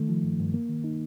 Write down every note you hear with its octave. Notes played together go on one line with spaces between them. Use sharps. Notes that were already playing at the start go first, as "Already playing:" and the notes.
Already playing: D#3 A3
F3
G2
G2
A#3
D#3
D#4